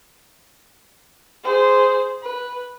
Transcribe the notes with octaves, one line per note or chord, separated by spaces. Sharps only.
G#4 C5
B4